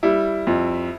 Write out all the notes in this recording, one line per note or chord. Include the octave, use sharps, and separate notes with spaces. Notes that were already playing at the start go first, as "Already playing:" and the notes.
G3 E4
F2